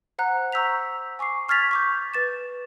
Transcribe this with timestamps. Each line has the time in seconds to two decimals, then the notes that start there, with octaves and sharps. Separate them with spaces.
0.18 C5 F#5 A#5 F#6
0.52 A#5 C#6 E6 G6 B6 F7
1.19 G#5 C#6 D6 C7
1.49 C#6 F6 G#6 A6 B6 F7
1.71 C#6 D6 G6
2.14 B4 A6 E7